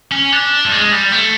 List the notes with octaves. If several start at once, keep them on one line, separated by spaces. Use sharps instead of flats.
C#4
D4
G3
G#3
G3
A3